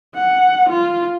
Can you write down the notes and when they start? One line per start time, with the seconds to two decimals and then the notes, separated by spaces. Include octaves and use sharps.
0.15 F#5
0.69 F4